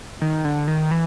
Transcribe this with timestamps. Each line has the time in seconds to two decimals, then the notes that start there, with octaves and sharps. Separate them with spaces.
0.21 D#3
0.45 D3
0.67 D#3
0.91 E3